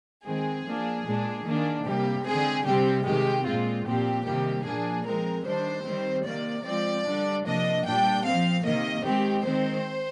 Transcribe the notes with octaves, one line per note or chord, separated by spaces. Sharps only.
D#3 G#3 C4 G#4
F3 A#3 D4
A#2 G#3 D4
D#3 A#3 D4
C3 G3 A#3 G4
D3 G#3 C4 G#4
C3 G3 C4 G4
C3 D#3 G#3 G4
A#2 G#3 C4 F4
A#2 F3 C4 G4
C3 D#3 G3 A#3 G4
A#2 F3 A#3 D4 G#4
F3 G#3 C4 A#4
D#3 G3 D4 C5
D#3 G3 C4
C3 D#3 A#3 D5
F3 G#3 C4 D5
D3 G3 D4
C3 F3 A#3 D4 D#5
A#2 G3 D4 G5
F3 C4 F5
C3 D#3 A#3 D#5
D#3 G#3 C4 G4
D#3 G#3 C4 C5